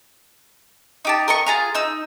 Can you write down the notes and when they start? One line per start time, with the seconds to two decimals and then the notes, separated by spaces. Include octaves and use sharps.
1.05 D#4 G4 A5
1.28 A#4 D#5 C#6
1.46 F4 G#4 A#5
1.75 D#4 E6